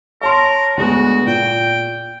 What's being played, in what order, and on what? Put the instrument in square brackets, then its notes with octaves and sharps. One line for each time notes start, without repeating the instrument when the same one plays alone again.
[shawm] A#4 [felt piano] C#5 A5 C6
[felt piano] D2 G#3 B3 [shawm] F#4
[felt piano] A#2 [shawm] G5